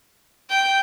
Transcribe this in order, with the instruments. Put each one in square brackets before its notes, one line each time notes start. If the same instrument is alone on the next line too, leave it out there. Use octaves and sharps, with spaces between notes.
[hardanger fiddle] G5